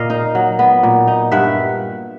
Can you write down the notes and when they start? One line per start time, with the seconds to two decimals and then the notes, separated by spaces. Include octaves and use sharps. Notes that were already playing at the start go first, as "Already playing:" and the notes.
Already playing: A#2 D#5 F5
0.10 D#4
0.35 F#3
0.59 B3
0.83 A#2
1.07 D#4
1.31 G2 E5 F#5